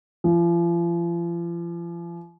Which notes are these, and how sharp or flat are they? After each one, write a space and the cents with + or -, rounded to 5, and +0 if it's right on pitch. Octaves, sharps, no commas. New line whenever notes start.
F3 -40